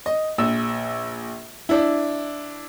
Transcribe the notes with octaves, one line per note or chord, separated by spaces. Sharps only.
D#5
A#1 E6
D4 E4